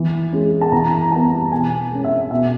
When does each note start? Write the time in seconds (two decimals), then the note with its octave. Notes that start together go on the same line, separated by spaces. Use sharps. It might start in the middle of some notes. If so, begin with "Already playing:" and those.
Already playing: E3
0.33 G#3 C#4
0.61 A5
0.72 E3 A#5
1.12 G3 B3 A5
1.51 B2 G#5
1.91 G#3 C#4
2.04 E5
2.31 B2 E5